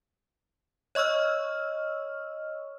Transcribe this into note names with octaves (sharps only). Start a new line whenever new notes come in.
C#5 D#5 C#6 E6 F6